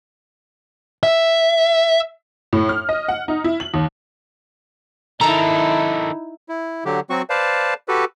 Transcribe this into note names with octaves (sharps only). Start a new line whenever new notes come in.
E5
A2
F6
D#5
F#5
D#4
E4
F#7
D#2
D#3 D#4 E4 A4 A#5
E4
D3 F#3 G4
F#3 C4 F#4 C#6
B4 C5 D5 F5 A5
F#4 G4 A4 B4